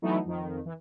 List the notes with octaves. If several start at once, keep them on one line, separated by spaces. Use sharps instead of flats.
E3 F#3 A3 B3 D#4 E4
F2 D#3
E3